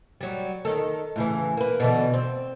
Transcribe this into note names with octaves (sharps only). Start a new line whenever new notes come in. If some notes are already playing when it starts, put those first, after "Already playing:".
F#3 G3
D#3 A4
A2 C#3 E3
A#3 B4
B2 D3 E3
C4